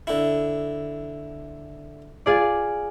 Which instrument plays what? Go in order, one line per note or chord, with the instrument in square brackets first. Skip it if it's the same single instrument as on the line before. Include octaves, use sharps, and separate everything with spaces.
[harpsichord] D3 E4
[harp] F4 G#4 D5